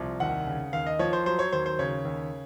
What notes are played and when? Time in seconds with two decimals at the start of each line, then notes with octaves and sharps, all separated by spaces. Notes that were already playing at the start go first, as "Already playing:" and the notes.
Already playing: C2 F3
0.20 D#2 F#5
0.47 C#3
0.73 D#2 F5
0.87 D#5
0.99 F3 C#5
1.13 C5
1.26 F#3 C5
1.39 C#5
1.52 D#2 C5
1.66 C5
1.79 C#3 C#5
2.05 D#2